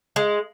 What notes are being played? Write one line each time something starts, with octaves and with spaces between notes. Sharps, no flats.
G#3